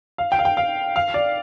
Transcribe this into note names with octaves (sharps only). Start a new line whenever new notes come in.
F5
G5
F5
G5
F5
F5
D5